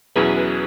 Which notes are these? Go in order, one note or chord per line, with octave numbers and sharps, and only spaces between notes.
E2 B2 F#3 C#4 E4 G#4 B4